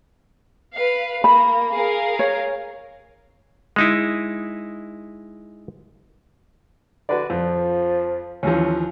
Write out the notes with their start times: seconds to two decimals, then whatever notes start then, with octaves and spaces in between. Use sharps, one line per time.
0.75 B4 F5
1.24 A#3 B5
1.74 G#4 A#4 F5
2.19 C#5
3.76 G#3 D#4 E4
7.09 D3 F#4 B4 D5
7.30 F2 F3
8.43 D#2 E3 F3 C#4